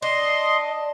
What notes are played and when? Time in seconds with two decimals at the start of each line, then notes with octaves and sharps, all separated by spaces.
0.02 D4 D#5 C6